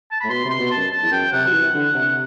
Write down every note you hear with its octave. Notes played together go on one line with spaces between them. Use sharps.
A5
A2 B5
B2 C6
C3 C6
B2
A5
F#2
A5
E2
F#2 G5
C3 F#5
F#3
E3
D3
C3